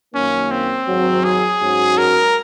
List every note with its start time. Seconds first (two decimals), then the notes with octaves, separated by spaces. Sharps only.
0.15 F#2 D#3 A#3 C#4
0.51 C4
0.88 G#1 G#2 F#3
1.24 G#4
1.61 G#2 F#3 C#4 F#4
1.98 A#4